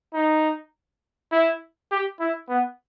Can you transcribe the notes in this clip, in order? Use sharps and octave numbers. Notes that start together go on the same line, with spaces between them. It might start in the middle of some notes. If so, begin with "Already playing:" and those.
D#4
E4
G4
E4
B3